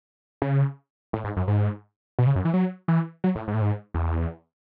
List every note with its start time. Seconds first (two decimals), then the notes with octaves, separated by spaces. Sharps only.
0.42 C#3
1.13 A2
1.24 G#2
1.37 F#2
1.48 G#2
2.19 B2
2.27 C#3
2.36 F#2
2.45 E3
2.54 F#3
2.88 E3
3.24 F#3
3.35 A2
3.48 G#2
3.54 A2
3.62 G#2
3.94 E2